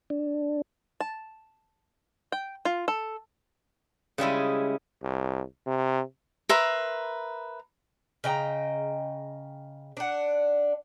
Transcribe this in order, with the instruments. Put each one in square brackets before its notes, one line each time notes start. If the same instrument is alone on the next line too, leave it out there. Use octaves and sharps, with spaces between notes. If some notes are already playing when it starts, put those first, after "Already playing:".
[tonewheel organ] D4
[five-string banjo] A5
G5
F4
A4
[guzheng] C#3 G3 G#3 E4
[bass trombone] C2
C3
[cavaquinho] A#4 B4 E5 C6
[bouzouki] C#3 D#5 G5 A#5
D4 F#5